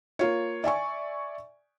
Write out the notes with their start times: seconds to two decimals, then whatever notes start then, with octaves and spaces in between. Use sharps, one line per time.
0.19 A#3 F4 C#5
0.64 D5 E5 G#5 C#6